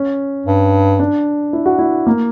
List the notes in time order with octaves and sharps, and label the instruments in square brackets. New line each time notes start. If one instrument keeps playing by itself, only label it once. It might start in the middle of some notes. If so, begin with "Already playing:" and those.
Already playing: [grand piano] C#4
[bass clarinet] G2
[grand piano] D4
E4
F#4
E4
A#3